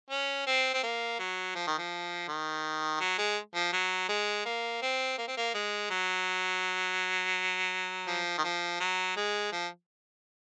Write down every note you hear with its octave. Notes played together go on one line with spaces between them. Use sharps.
C#4
C4
C4
A#3
F#3
F3
D#3
F3
D#3
F#3
G#3
F3
F#3
G#3
A#3
C4
A#3
C4
A#3
G#3
F#3
F3
D#3
F3
F#3
G#3
F3